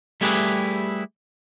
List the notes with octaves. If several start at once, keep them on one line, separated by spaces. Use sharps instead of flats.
G3 A3 E4 G4 G#4 B4